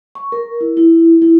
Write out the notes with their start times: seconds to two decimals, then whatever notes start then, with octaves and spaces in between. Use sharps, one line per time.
0.15 C#6
0.32 A#4
0.61 E4
0.77 E4
1.22 E4